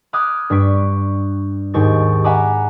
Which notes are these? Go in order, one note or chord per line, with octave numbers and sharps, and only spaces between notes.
B5 D6 D#6 F6 F#6 G#6
G2 G3 C#6 B6 D7
D#2 G#2 G4 C#6 A6
E5 F#5 G#5 A#5 B5 D6